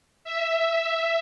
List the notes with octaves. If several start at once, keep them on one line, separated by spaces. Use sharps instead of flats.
E5